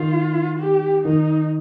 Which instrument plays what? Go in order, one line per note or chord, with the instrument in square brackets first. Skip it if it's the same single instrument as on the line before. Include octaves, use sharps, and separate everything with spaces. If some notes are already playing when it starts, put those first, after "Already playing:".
Already playing: [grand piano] D#3 [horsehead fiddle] F4
[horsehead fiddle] G4
[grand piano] D#3 [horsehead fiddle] D#4